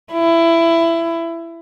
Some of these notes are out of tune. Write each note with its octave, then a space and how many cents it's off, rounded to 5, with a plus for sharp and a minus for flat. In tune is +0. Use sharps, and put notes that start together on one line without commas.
E4 +20